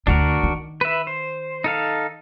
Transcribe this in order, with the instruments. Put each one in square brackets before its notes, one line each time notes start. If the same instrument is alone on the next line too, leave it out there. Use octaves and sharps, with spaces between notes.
[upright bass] D2 D3 [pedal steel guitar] D4 F#4 A#4
[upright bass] D#3
[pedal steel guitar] B4 E5
C5
D#4 A4 F5